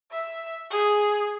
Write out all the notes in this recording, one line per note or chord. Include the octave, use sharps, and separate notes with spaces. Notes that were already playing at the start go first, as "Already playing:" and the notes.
E5
G#4